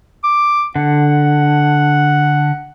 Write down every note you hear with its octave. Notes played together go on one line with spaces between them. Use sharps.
D6
D3 F#5